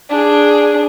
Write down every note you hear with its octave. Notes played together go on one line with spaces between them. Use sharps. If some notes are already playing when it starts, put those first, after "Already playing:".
D4 G#4